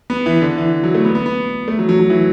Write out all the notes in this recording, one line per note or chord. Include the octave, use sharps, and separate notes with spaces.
B3
E3
D3
E3
F#3
A3
B3
B3
B3
A3
F#3
F#3
F#3
E3